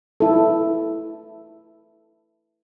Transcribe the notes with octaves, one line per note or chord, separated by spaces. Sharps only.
E4 A4